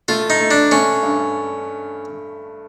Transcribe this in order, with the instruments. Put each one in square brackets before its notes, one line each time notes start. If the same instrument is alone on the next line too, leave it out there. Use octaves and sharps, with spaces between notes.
[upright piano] A3 [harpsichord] F4
[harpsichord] D#4
[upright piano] A3
[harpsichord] D4
[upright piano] A3 [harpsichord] C#4
[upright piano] G2